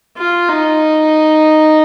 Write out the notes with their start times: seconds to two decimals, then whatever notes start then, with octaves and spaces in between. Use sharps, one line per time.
0.17 F4
0.48 D#4